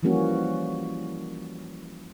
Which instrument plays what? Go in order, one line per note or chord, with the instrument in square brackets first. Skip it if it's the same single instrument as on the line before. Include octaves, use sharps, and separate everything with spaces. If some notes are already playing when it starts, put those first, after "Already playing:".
[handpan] E3 F3 G3 A#3 C#4 F#4